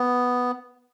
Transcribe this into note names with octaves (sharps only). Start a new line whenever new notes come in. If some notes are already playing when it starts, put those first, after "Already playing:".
Already playing: B3